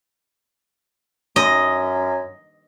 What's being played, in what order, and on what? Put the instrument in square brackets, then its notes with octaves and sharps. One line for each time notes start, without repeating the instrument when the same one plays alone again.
[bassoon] F#2 [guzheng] D#5